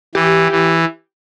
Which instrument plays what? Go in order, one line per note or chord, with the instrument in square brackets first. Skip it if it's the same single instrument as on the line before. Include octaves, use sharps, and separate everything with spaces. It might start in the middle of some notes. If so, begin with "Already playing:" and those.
[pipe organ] E3 [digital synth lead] G4
[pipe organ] E3